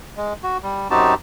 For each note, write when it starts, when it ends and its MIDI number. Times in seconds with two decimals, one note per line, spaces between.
0.17 0.33 56
0.44 0.57 66
0.63 0.88 55
0.90 1.14 42
0.90 1.14 60
0.90 1.14 63
0.90 1.14 66
0.90 1.14 67
0.90 1.14 81